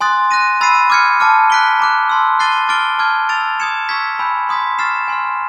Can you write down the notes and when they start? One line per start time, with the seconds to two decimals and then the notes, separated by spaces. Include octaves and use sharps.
0.01 G#5 C6 D#6 F#6 A6
0.31 F#6 A#6 D#7
0.61 B5 E6 A6 C7 D#7
0.90 D6 F6 G#6 C#7
1.20 A5 D6 F6
1.50 F#6 B6 D7 G7
1.79 A#5 D6 F#6
2.09 A5 C6 E6
2.39 F#6 A6 C7 D#7 G7
2.69 D6 F6 A6 D7 G7
2.99 A5 D6 F6 G#6
3.29 E6 A6 D7 F7
3.60 D#6 G#6 C#7 E7
3.89 C#6 E6 G#6 B6
4.19 G#5 B5 E6 G6
4.49 C6 D#6 G#6 B6
4.79 C#6 F6 A6 C7 E7
5.08 G#5 C6 F6